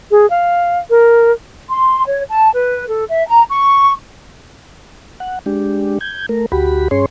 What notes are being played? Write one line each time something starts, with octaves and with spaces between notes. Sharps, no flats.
G#4
F5
A#4
C6
C#5
A5
B4
A4
E5
A#5
C#6
F#5
G#3 D4 G4
G6 G#6
A3 A#4
D2 F#4 G4 B5
G2 C#4 G#4 C#5 C6